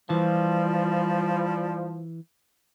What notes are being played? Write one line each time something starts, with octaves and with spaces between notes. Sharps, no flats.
E3 F3 G3